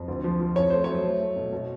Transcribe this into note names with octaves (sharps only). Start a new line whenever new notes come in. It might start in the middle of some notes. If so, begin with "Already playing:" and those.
Already playing: F2
D2
F3
F3
F2 C#5
A3 C5
F#3 C#5
A3
A3
B2
B2